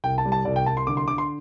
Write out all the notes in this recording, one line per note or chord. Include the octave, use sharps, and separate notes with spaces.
C2 G5
A5
G3
A5
C2 D5
G5
C2 A5
C6
D3 D6
C6
D3 D6
C6